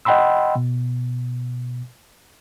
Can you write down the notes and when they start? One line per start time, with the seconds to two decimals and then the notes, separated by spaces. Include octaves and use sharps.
0.05 D#5 F#5 G5 B5 C6 E6
0.56 B2